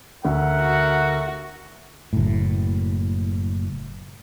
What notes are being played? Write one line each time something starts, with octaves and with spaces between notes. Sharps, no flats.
D2 A#4 E5 F#5
F#4
F#1 A2